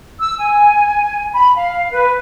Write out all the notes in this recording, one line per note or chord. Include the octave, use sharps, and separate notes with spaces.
E6
G#5
B5
F5
B4